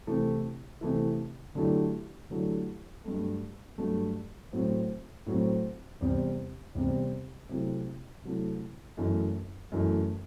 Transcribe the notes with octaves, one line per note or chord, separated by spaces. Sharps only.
C3 E3 A3 E4
C3 E3 A3 E4
D3 F#3 A3 E4 G4
D3 F#3 A3 E4 G4
G2 F#3 A3
G2 F#3 A3
A2 F#3 C4
A2 F#3 C4
E2 C3 G3 C4
E2 C3 G3 C4
C3 F#3 A3 E4
C3 F#3 A3 E4
F#2 E3 A3
F#2 E3 A3